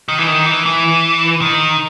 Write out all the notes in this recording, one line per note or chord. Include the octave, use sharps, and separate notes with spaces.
D#3
E3
D#3
E3
E3
D#3